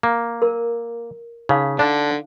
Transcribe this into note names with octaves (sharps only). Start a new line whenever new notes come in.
A#3
A#4
C#3 D#4 F5
D3 D4